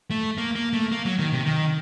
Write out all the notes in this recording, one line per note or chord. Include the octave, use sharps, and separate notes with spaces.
A3
A#3
A#3
A3
A#3
F#3
D#3
C3
D#3